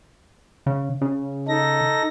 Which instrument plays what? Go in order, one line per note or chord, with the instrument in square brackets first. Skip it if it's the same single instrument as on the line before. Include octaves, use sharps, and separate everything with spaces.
[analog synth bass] C#3
C#3
[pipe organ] D#4 A4 A#6